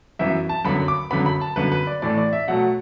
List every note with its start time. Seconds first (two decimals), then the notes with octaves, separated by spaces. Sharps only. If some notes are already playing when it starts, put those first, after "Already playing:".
0.19 F#2 E3 B3 E5
0.49 A5
0.65 F#2 D3 F#3 B3 B5
0.88 D6
1.11 F#2 D3 F#3 B3 B5
1.26 B5
1.41 A5
1.56 F#2 D3 B3 B4
1.72 B4
1.87 D5
2.02 A2 E3 A3 D5
2.18 D5
2.33 E5
2.48 B2 F#3 A3 F#5